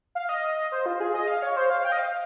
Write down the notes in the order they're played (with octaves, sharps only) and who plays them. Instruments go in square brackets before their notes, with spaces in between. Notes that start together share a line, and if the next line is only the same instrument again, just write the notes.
[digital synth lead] F5
D#5
C5
F4
G#4
D#5
F5
C#5
C5
F5
G5
D#5
F5